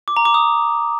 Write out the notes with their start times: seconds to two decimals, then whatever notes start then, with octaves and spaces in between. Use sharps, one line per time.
0.08 D6
0.17 A#5
0.25 D6
0.34 D#6